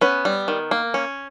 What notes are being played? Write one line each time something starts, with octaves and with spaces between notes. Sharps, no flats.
B3 C#4 B4
G3
D#3
A#3
C#4